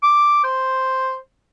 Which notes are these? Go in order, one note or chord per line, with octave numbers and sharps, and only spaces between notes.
D6
C5